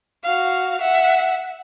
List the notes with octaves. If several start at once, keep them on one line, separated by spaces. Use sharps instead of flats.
F#4 F5
E5 F#5